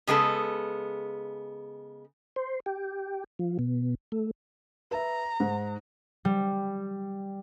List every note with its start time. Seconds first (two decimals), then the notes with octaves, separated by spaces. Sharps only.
0.07 C#3 G#3 B3 A4
2.36 C5
2.66 G4
3.39 F3
3.59 B2
4.12 A3
4.91 B4 E5 A#5
5.40 G#2
6.25 G3